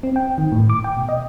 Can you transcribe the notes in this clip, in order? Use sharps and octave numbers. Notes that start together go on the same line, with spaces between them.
C4
G5
D#3
A2
D6
G5
B2
D#5